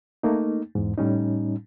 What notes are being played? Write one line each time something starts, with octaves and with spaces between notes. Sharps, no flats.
A3 A#3 D#4
E2 G#2
A2 G3 C#4 D#4